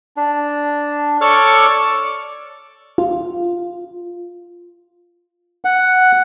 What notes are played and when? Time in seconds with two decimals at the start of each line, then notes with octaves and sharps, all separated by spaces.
0.17 D4
1.21 A4 C#5 D5 C#6 D6 F6
2.98 F4
5.65 F#5